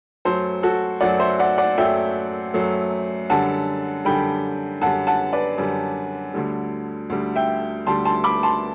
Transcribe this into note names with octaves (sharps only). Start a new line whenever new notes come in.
F#2 F#3 A3 A4 C5
F#4 A4
F#2 F#3 A3 D5 F#5
C5 E5
D5 F#5
D5 F#5
F#2 F#3 A3 E5 G5
F#2 F#3 A3
F#2 D3 G3 F#5 A5
F#2 D3 G3 G5 B5
F#2 D3 G3 F#5 A5
F#5 A5
B4 D5
F#2 D3 G3
D2 D3 G3
D2 D3 G3
E5 G5
D2 D3 G3 A5 C6
A5 C6
B5 D6
A5 C6